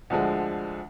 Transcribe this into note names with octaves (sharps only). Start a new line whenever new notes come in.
D2 D3 F3 G#3